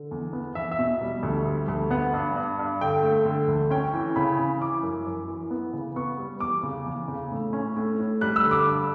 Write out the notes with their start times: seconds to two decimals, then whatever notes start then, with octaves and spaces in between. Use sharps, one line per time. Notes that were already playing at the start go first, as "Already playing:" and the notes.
Already playing: D3
0.11 E2
0.33 B3
0.55 E2 E5
0.71 E5
0.79 B2
1.02 G3
1.23 D2
1.47 G3
1.68 D2
1.91 B3 F#5
2.13 G2
2.36 G2
2.59 G2
2.81 D3 G5
3.03 A3
3.25 D3
3.48 D2
3.70 C#4 G5
3.93 E3
4.16 C#3 B5
4.39 C#4
4.61 E3 D6
4.83 F#2
5.07 F#2
5.28 E3
5.51 B3
5.73 C#3
5.96 B3 C#6
6.18 G3
6.40 E2 D6
6.63 C#3
6.86 E2
7.08 C#3
7.32 A2
7.53 C#4
7.76 A2
7.99 A2
8.21 G3 F#6
8.36 E6
8.44 D3
8.51 D6
8.66 G2